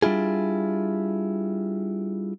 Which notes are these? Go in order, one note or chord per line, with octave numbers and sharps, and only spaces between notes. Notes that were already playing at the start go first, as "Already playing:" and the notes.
G3 D4 E4 F4 G#4